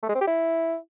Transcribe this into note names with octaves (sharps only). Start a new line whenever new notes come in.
A3
G#3
C4
G4
E4